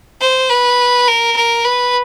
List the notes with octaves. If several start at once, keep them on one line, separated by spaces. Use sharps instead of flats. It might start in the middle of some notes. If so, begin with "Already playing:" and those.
C5
B4
A#4
A#4
B4